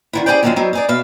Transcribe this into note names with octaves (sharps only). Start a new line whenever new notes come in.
D3 D#3 E4
G4 G#4 A#4 C5 D5 G5
F#2 D3 D#3 F3 C4 C#4
F#3 G3 C4 D#4
D#4 G#4 D5
B2 E5 F5